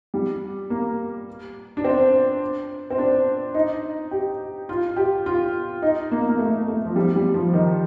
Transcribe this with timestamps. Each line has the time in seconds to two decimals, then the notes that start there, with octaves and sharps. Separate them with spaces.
0.14 G3
0.70 A#3
1.77 D4
1.84 C4
2.90 C4
2.98 D4
3.54 D#4
4.11 G4
4.69 F4
4.97 G4
5.26 F4
5.82 D#4
6.11 A#3
6.28 A#3
6.39 A3
6.68 A3
6.85 F3
6.96 G3
7.16 G3
7.34 F3
7.53 D#3